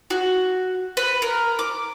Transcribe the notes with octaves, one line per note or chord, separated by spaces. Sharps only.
F#4
B4
A#4
D6